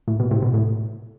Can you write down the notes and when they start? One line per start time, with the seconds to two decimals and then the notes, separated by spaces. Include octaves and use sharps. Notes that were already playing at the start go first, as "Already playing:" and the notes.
0.08 A2
0.20 B2
0.31 A2 C3
0.42 B2
0.54 A2